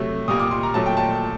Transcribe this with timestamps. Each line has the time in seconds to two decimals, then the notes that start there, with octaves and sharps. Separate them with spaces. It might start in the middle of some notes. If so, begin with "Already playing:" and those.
Already playing: C3 F#3 A3
0.28 A#2 G3 A#3 D#6
0.40 D6
0.51 C6
0.63 A#5
0.74 A#2 F#3 A3 A5
0.86 G5
0.97 A5